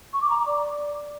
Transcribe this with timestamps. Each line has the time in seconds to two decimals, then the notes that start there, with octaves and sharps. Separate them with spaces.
0.13 C#6
0.22 D6
0.30 A#5
0.38 D6
0.47 D5